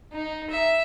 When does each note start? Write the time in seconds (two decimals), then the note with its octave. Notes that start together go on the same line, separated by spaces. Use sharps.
0.12 D#4
0.50 E5